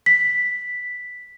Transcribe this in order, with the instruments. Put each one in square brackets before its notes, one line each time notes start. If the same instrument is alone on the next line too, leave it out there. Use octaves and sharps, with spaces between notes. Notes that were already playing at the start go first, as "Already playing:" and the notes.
[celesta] B6